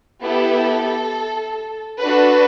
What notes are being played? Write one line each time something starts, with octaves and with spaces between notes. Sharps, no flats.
B3 E4 G4 A4
D4 F#4 A4 B4